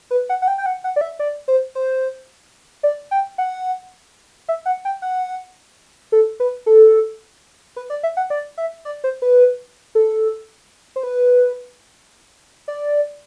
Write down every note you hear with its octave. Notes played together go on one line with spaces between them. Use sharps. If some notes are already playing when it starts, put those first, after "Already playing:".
B4
F#5
F#5
G5
G5
F#5
F#5
D5
E5
D5
C5
C5
D5
G5
F#5
E5
F#5
G5
F#5
A4
B4
A4
B4
D5
E5
F#5
D5
E5
D5
C5
B4
A4
C5
B4
D5